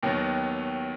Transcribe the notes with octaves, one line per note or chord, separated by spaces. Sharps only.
D#2 D#3 F#3 B3 F#4